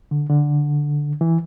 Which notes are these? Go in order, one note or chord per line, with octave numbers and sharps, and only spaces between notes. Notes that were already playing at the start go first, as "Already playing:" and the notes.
D3
D3
E3